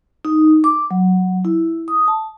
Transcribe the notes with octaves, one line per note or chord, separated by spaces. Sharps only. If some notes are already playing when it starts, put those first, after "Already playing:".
D#4
D6
F#3
E4
D#6
A5